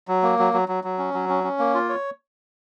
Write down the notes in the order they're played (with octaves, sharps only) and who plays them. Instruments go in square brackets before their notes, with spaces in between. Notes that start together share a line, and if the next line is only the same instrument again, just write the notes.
[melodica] F#3
A#3
F#3
F#3
F#3
F#3
C#4
F#3
C#4
C#4
A#3
F4
C#5